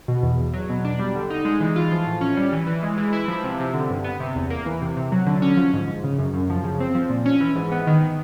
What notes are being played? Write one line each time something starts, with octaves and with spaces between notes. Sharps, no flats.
B2
E2
E2
F#3
B2
D4
G3
D3
D#4
G#3
E3
F4
F3
A2
C#4
G3
E3
E3
G#3
E3
E4
F3
C3
C3
D3
G2
B3
C3
E2
A#3
E3
C3
C3
F#3
D3
C#4
F3
G#2
G#2
C#3
F#2
F#2
F3
C#3
C4
F3
A#2
C#4
E3
G#2
B3
D#3